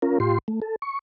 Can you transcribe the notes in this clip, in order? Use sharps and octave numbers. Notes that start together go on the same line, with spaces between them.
C#4 F4 A#4
A2 F4 G4 C6
A3
A4
C#6